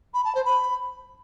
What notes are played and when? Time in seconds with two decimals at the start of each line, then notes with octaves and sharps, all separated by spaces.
0.13 B5
0.24 A5
0.34 C5
0.45 B5